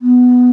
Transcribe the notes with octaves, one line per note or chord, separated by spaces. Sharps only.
B3